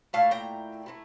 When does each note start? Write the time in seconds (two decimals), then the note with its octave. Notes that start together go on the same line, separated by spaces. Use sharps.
0.13 A#2 A3 E4 F5 A5
0.31 G5 A#5
0.86 A3 C4 E4